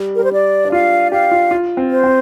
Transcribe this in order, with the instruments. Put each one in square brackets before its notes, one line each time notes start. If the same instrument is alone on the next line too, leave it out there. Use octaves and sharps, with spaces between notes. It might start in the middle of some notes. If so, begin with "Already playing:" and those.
Already playing: [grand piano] G3
[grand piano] G3 [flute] A#4
[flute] C5
D5
[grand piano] D4
[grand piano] F4 [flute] F5
[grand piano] G4 [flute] F5
[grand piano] F4
F4
C4
[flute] C5
[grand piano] C4